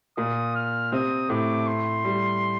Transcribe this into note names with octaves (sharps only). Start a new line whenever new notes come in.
A#2 A#3 D#6
F6
C3 C4 D#6
A2 A3 D6
C6
G3